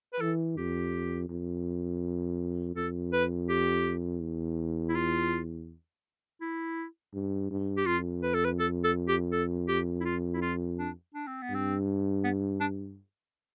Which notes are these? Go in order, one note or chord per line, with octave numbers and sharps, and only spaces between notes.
B4
E3 A4
F2 G4
F2
F2 A4
B4
G4
E2
E4
F4
E4
G2
G2
G4
F2 F4
B4
A4
B4
A4
A4
G4
A4
G4
E4
F4
E4
F4
D4
D4
C4
B3
G2 C4
B3
D4